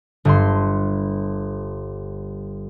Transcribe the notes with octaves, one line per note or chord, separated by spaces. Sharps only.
G1 C6